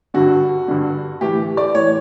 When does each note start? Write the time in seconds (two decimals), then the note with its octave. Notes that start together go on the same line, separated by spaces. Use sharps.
0.14 G2 D3 F#4
0.68 G2 D3
1.21 A2 E3 G4
1.57 D5
1.74 A2 E3 C#5